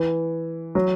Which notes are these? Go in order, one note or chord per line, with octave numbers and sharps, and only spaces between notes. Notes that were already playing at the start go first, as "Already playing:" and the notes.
Already playing: E3
F#3